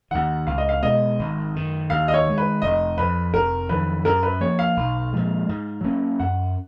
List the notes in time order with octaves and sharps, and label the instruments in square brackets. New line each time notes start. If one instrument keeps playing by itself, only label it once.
[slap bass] D#2 D#3 [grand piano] F#5
[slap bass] C#2 [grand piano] F5
[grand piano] D#5
F5
[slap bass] B2 G#3 B3 [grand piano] D#5
[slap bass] G#1
F#2 D#3
[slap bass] D#2 [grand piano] F5
[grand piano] D#5
C#5
[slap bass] D#3 G#3
[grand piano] B4
[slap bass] F1 [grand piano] D#5
[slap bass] F2 F3 [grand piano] B4
[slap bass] F1 [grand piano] A#4
[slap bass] F2 D#3 F#3 [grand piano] B4
[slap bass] F#2 [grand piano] A#4
[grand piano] B4
[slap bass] F3 A#3 [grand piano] C#5
[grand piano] F5
[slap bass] B1
A#2 F3 G#3
G#2
F#3 A#3 C#4
[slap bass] F#2 [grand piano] F#5